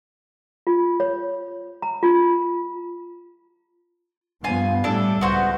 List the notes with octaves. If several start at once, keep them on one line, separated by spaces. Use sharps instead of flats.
F4
C#5
A#5
F4
G2 F3 B3 F4 G#5
A2 G3 D4 E4 A4
C#2 B3 F#4 C5